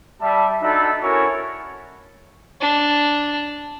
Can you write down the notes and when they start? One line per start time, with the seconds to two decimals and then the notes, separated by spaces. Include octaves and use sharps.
0.21 G3 E5 A5
0.62 D4 D#4 F#4 A4 E5 B5
1.03 C#4 E4 F#4 A4 A#4 C#5
2.61 D4